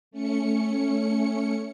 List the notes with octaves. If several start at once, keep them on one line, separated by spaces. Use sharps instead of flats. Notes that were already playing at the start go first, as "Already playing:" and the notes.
A3 C#4 C#7